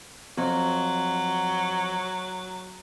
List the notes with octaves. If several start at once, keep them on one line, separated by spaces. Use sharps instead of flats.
F2 F#3